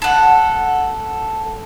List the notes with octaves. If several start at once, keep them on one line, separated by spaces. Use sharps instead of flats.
A4 F#5